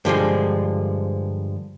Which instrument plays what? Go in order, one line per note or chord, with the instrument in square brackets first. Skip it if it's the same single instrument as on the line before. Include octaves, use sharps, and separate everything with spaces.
[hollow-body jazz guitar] G2 D3 F3 G#3